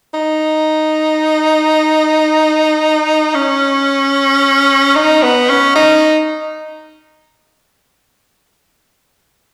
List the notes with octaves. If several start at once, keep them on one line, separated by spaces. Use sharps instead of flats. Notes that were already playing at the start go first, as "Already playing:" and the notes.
D#4
C#4
D#4
B3
C#4
D#4